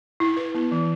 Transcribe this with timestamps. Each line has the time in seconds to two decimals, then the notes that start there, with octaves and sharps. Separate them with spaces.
0.20 E4
0.37 B4
0.55 B3
0.72 E3